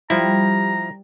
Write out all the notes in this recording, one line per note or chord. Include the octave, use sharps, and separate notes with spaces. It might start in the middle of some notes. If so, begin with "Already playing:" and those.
F3 G3 E4 A#5